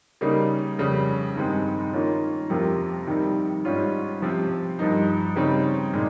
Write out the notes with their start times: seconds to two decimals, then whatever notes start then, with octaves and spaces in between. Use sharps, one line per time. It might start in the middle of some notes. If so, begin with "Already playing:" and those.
0.21 C#3 G3 A#3 D#4
0.79 F2 C#3 G3
1.36 G2 D#3 G#3 C4 D#4
1.93 D#3 A#3 C#4 F4
2.50 F2 C3 F3 A#3 F4
3.07 C3 D#3 G3
3.65 G#2 G3 C#4 F4
4.22 C3 F3 C4
4.79 G2 F3 A#3 D#4
5.36 C#3 G3 C4 D#4
5.93 A#2 G#3 D#4